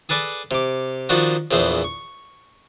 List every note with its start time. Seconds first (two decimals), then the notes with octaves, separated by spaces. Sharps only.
0.09 G#4 A4 B4 D5 G#5
0.51 C3 D6
1.09 D#3 F3 D4 F#4
1.51 A#1 E2 E3 C5
1.84 C#6